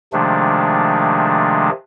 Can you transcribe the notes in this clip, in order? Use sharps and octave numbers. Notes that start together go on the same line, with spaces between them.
C3 D#3 F3 G#3 A3 D4